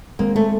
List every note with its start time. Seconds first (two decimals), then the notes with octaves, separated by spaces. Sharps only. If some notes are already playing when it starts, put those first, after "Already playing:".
0.19 D#3 G#3 A#3 C4
0.36 A3